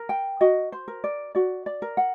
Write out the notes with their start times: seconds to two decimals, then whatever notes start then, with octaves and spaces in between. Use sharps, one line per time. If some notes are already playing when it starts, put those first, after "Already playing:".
Already playing: A#4
0.09 G5
0.41 F#4 D#5
0.72 C5
0.88 A#4
1.04 D5
1.35 F#4 D5
1.66 D5
1.82 A#4
1.97 F#5